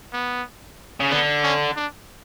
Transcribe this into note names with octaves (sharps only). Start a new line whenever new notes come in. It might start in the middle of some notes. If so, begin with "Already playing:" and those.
B3
C#3
D3 B3
C#4
D4